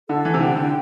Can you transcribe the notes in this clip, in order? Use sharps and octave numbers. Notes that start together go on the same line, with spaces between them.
D3 A4
E3
C3
D3 G5
D3